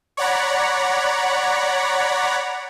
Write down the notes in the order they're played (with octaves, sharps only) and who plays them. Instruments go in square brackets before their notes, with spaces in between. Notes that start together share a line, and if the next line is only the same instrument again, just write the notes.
[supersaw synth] C#5 D5 F#5 A#5 B5